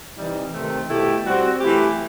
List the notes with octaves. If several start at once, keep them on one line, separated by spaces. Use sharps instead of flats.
C3 E3 G3 D#4
C3 D#3 A3 C4
B2 A3 E4 G4
G3 C4 F#4
E3 A3 E4 G4